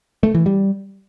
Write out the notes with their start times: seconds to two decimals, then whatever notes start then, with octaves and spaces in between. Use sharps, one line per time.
0.23 A3
0.35 E3
0.46 G3